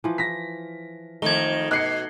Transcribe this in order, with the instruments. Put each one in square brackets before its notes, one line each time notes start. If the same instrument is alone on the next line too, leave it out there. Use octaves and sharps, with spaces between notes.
[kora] E3 F3
[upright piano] A#6 B6
[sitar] F2 D#3 [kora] A3 [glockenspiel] G#6 G7
[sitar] B2 [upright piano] F#6 C7 C#7